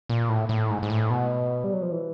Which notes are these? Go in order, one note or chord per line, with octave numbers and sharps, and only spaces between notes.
A#2
A2
A2
G#2
G#2
A2
B2
G3
F#3
F3
E3